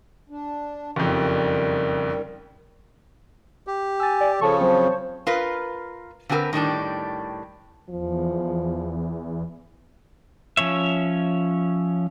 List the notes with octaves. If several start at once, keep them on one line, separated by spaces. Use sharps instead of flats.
D4
F#1 F2 D#3 G3
G4
G#5 E6 A6
D5
C#3 F3 A4 C#5 A5 C#6
F#3 C4 C5
F4 A#4 B4
D3 C4 F#4 G#4 A#4 B4
A2 D#3 G3 D4
E2 F3
F3 C#4 C#5 E5